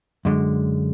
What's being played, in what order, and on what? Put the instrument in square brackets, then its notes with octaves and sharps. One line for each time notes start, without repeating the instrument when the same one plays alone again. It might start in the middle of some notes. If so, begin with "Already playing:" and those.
[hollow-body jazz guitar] F#2 D3 G#3